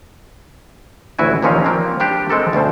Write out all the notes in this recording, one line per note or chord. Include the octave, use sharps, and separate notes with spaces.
A1 D2 E4 F#4 G#5
D#2 A#2 F3 C#4 A#4 F5
F3 A#3 C4 D4
G3 D4 G4
G#3 C4 F#4 A4 A#4
D2 B2 G3 C5